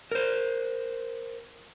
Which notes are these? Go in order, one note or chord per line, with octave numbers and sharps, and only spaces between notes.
A#4 C5